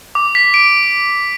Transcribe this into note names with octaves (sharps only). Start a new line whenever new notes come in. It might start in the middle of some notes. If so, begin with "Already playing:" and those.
D6
B6
D7